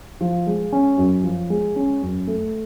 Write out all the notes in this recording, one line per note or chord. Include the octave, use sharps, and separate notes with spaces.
F3
G#3
C#4
F#2
F3
G#3
C#4
F#2
A3